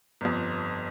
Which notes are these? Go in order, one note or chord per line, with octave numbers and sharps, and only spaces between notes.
G1 F2